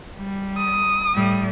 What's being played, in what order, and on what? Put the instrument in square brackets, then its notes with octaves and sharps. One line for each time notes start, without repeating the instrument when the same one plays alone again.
[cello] G3
[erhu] D#6
[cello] A2 G3